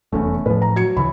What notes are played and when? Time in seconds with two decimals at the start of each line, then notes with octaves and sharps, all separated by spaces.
0.12 F1 E2 A3 C#4
0.46 A2 F3 B4
0.62 A#5
0.76 F#3 G#6 C#7
0.97 D2 C#3 E3 B5